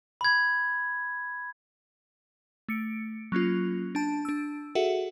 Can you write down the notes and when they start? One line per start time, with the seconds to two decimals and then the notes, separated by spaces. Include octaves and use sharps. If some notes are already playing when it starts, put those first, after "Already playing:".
0.21 B5 G#6
2.69 A3 C#7 D7
3.32 F#3 A#3 C#4 F4
3.95 D4 A5
4.25 D4 E6
4.75 F#4 G#4 A4 E5 F#5